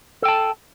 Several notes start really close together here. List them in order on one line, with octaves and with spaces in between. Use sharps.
A4 G5 A5